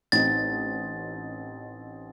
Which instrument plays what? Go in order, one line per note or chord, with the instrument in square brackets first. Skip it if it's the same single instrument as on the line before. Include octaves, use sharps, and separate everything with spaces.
[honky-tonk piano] A1 C4 D#4 [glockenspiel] A6